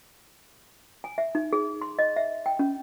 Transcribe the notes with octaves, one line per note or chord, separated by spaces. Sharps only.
G#5
E5
D#4
G#4
C6
D#5
E5
G5
C#4